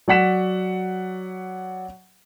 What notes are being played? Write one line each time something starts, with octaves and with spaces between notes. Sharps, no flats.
F#3 D5 F#5 B6 E7